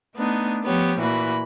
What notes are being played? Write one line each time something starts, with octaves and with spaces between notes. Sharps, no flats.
A3 B3 D4 D#4
F3 B3 G4 C#5
A#2 E3 F#4 B5